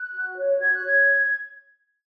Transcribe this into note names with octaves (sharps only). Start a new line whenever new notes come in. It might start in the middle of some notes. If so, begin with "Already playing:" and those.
Already playing: F#6
F#4
C#5
F#4 G#6
F#6
C#5 G#6